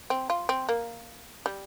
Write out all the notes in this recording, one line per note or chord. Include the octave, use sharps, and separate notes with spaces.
C4
F4
C4
A#3
G3